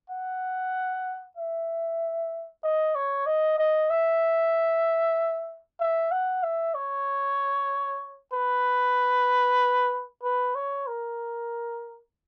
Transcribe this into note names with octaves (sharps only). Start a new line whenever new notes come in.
F#5
E5
D#5
C#5
D#5
D#5
E5
E5
F#5
E5
C#5
B4
B4
C#5
A#4